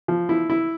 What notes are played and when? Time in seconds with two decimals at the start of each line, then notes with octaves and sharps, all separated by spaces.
0.08 F3
0.29 E4
0.50 E4